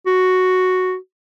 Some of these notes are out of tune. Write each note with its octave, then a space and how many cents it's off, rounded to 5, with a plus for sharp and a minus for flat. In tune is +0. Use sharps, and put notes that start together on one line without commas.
F#4 +0